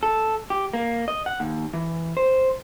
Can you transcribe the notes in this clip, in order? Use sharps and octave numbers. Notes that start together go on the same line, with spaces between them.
A4
G4
A#3
D#5
F#5
D#2
E3
C5